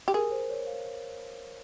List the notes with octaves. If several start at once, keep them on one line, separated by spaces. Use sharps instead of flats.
G4
G#4 A#4
C5
C#5
F5